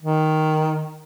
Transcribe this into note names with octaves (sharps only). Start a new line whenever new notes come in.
D#3